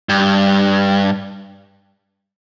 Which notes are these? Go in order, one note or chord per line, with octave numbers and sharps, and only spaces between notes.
G2